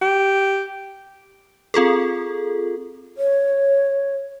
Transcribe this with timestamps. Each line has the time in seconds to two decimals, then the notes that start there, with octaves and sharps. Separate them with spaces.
0.01 G4
1.74 C4 F4 G#4 A4
3.18 C#5